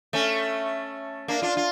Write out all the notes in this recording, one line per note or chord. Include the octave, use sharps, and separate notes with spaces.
A3 C#4
A#3 D4
D4 F4
F4